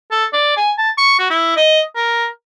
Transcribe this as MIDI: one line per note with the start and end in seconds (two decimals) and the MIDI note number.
0.11 0.25 69
0.33 0.55 74
0.57 0.72 80
0.78 0.91 81
0.98 1.15 85
1.19 1.29 66
1.30 1.56 64
1.57 1.82 75
1.96 2.27 70